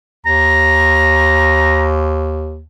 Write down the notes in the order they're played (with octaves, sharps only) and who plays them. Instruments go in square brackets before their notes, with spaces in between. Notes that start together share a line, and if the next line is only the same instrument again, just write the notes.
[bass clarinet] D#2 [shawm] A#5